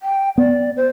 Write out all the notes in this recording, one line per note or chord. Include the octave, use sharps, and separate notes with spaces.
G5
B3 D5
C5